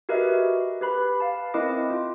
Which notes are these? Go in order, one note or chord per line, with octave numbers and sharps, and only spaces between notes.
F#4 G4 A#4 B4 D#5 E5
G4 B4 B5
F5 A5
C4 E4 A#4 D#5 D6 A#6
F4